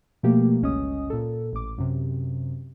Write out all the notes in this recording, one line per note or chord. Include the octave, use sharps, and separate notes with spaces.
B2 F3 A3 A#3 G4
G1 C#2 C#4 D#5 D#6
A#2 A4
A1 D6
F#2 C3